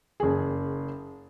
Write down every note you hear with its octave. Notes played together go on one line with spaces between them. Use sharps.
F#1 G#4